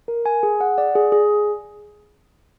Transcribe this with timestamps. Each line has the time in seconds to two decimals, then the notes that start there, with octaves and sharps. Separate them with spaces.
0.08 A#4
0.26 G#5
0.43 G#4
0.61 F#5
0.78 D5
0.95 G#4
1.12 G#4